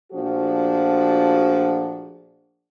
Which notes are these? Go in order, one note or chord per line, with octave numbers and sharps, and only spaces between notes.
A#2 F3 A3 D4 F#4 G#4